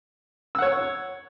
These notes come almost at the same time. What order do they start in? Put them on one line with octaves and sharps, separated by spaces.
E6 F#5 C#5